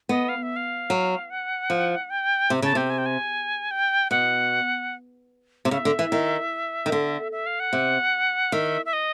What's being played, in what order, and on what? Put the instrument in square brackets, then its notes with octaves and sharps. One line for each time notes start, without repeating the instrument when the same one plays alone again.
[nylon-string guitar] B3 [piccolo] D#5
[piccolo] F5
E5
F5
[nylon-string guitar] F#3
[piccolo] F#5
[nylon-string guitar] F3
[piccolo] G5
[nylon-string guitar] C3
[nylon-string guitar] C#3 [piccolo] A5
[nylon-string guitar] C3 [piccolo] G5
[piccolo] G#5
G5
G#5
G5
[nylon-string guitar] B2 [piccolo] F#5
[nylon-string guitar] C3
[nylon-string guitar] C#3 [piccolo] E5
[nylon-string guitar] D3
E3
D#3
D#3
D3
[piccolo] E5
F5
F#5
[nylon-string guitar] C3
[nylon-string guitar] D#3 [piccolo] E5
[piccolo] E5
D#5